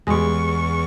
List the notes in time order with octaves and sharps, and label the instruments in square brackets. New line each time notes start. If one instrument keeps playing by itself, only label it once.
[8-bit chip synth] E2 C#6 [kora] G3 G#3